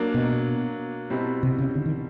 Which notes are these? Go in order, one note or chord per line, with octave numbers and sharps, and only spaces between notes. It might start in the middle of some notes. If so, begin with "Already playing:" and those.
Already playing: F#3 A#3 D4
B2
B2 G3 C4 E4
C3
C#3
D3
D#3